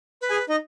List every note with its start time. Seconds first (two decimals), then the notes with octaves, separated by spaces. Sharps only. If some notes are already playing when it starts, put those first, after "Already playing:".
0.21 B4
0.30 G#4 G#5
0.49 D#4 D#5